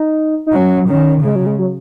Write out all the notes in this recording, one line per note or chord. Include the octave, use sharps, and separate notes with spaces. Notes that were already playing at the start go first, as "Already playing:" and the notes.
Already playing: D#4
D#4
F#3 C#4
D#3 C#4
C#3 G#3
F#3
G#3
F#3